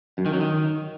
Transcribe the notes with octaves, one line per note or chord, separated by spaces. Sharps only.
F#2
D#3
F#3
D#3